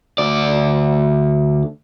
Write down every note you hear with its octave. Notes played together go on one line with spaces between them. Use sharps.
D2 D5